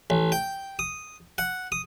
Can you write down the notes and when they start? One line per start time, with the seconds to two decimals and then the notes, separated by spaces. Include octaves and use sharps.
0.10 A1
0.32 G5
0.79 D#6
1.38 F#5
1.72 D#6